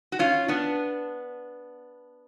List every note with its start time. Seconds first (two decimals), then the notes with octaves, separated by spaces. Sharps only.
0.12 F#4
0.19 C#4 F4
0.48 B3 D4